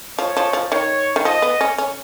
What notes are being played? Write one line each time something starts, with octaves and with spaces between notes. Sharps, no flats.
F3 C#5
F3
F3
D#3 C#5
D#3
F3 D#5
B3
C#4
C#4